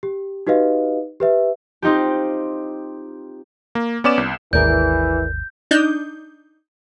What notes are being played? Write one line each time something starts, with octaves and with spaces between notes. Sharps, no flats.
G4
D#4 F#4 G4 B4 D#5 F5
G4 B4 E5
C4 D#4 F4 G4
A#3
B3 C#4 D5 D6 E7
C2
G#1 D#2 E3 G#4 A#4 D5 G6
D4 D#4 G6